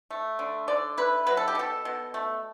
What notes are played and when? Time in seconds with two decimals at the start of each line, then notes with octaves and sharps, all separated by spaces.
0.11 A3
0.39 D3
0.68 D3 D5
0.97 E4 B4
1.27 F#3 B4
1.37 A4
1.48 G4
1.55 B2 A4
1.85 B2
2.14 A3